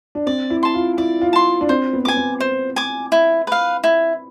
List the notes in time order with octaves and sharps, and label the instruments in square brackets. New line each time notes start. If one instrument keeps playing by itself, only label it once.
[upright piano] D4
[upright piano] C4 [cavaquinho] D5
[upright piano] E4
[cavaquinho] A5 C6
[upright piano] F4
[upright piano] E4 [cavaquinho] D5
[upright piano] F4
[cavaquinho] A5 C6
[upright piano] D4
[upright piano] C4 [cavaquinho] C5
[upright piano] B3
[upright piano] B3 [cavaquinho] G#5 D6
[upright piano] C4
[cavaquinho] C5
G#5 D6
E4
B4 F5
E4